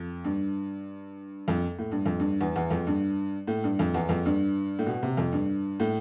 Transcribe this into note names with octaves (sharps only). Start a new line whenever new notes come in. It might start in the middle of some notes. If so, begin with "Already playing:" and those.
Already playing: F2
G2
F2
A2
G2
F2
G2
E2
E2
F2
G2
A2
G2
F2
E2
F2
G2
A2
B2
C3
F2
G2
A2